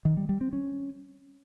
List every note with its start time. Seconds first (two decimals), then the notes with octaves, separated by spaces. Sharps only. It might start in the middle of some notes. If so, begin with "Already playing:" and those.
0.05 D#3
0.17 G3
0.29 G3
0.41 C4
0.53 C#4